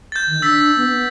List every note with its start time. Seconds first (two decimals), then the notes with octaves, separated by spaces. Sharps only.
0.12 G6 A6
0.27 D#3
0.42 D4 E6 A6 B6
0.77 B3
0.89 B3